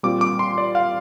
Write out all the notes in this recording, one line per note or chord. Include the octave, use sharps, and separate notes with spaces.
A#2 G3 C4 F4 D6
D6
C6
D5
F5